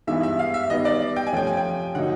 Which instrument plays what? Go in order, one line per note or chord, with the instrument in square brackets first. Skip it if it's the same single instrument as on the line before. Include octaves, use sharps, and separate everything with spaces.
[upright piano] G2 E3 G#3 B3 D#4 [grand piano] E5
[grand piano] E5
F5
E5
[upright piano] D#3 G3 B3 [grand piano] D#5
[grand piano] D5
G5
G#5
[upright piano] C3 F3 A3 C#4 [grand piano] G5
[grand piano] G#5
G5
[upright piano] D3 F#3 A#3 D#4 [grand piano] F#5